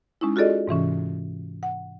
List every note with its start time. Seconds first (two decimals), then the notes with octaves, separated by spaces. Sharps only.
0.21 G#3 C#4 D#4 E4
0.36 F4 F#4 G#4 A4 D5 D#5
0.68 G#2 C3 E3 C#4
1.63 F#5